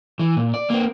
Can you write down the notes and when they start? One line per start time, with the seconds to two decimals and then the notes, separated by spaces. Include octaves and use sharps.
0.19 E3
0.36 A#2
0.54 D5
0.70 A#3 C4